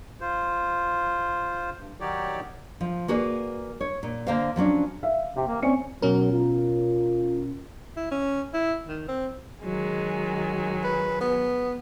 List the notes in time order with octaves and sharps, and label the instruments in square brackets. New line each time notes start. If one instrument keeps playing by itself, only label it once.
[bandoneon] F4 C5
G2
D#3 F#3 D#4 G4 C#5 D5
[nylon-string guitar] F3
A#3 F#4 G#4 B4 D5
C#5
A#2
D3 A#3 C5 F5
F3 F#3 C#4 D4
[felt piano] E5 F5
[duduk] C3 [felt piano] G5
[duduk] A#3
[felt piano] C4 D5 C#7 [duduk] C#4
[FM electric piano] B2 C#4 A#4 [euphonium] F#3
[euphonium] F4
[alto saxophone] E4
C#4
E4
D#3
C4
[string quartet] D#3 F#3 G#3
[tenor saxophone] B4
B3